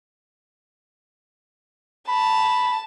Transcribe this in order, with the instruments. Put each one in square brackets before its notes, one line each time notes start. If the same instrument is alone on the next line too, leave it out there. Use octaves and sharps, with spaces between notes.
[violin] A5 [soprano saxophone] B5